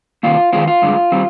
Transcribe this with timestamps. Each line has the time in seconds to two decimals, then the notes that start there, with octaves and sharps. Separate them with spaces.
0.23 C3 D#3 A#3 F4
0.53 F2 D#3 G#3 C4 F4
0.67 F4
0.82 G2 D3 G#3
1.12 D#3 G3 C4